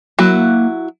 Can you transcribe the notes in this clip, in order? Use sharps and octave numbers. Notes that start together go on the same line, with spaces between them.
F#3 A#3 E4 F#4